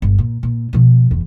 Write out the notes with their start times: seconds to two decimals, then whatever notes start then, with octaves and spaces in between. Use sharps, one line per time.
0.02 G1
0.18 A#2
0.43 A#2
0.73 B2 F3
1.11 F#1 E2